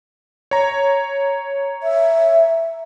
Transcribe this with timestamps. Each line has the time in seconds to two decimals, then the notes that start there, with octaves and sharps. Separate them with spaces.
0.51 C#5 A#5
1.83 E5